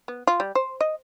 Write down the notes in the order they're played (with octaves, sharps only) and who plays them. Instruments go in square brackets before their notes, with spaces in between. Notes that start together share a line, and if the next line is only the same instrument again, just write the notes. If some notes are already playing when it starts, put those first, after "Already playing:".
[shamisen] B3
F4
G3
C5
D#5